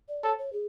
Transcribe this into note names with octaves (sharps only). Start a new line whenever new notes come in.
D5
A4 C#5
C#5
G#4